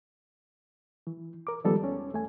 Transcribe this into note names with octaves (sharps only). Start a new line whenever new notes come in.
E3
A#4 D6
D#3 F3 G3 G#3 B3 A4
E2 C#4
E2 A3 G#5